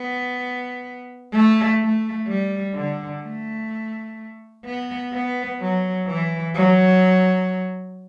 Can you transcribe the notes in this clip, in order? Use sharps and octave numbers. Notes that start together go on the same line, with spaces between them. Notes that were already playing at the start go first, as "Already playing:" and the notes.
Already playing: B3
A3
A3
G3
D3
A3
B3
B3
F#3
E3
F#3